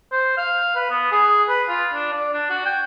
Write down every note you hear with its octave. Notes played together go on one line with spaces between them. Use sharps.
C5
F5
B4
B3
G#4
B4
F4
D4
D5
D4
F#4
G5